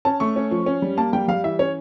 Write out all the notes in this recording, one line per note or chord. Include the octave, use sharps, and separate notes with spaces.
C#4 A5
A3 C#6
C#4
F3
C#4
G3
A#3 A5
G3 G5
G3 F5
E3 E5
C#4 C#5